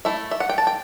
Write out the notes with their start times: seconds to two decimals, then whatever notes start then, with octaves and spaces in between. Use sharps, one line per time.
0.05 A3 E4 E5
0.31 E5
0.40 F#5
0.49 G5
0.58 A5
0.67 G5